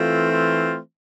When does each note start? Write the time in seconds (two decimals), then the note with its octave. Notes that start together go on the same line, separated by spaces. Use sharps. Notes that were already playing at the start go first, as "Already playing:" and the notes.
Already playing: E3 A3 C4 F4
0.32 F4